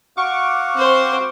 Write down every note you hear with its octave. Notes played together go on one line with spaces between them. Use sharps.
F#4 F5 F#5 C#6 D6
C4 C5